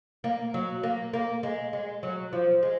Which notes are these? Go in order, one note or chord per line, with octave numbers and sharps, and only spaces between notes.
A#3
F#3
A#3
A#3
G#3
G#3
F#3
F3
G#3